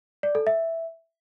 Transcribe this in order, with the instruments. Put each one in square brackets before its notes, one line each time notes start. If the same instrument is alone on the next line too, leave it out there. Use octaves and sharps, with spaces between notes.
[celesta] D5
A4
E5